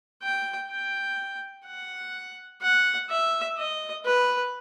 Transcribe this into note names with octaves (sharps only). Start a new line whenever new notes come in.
G5
G5
F#5
F#5
E5
D#5
B4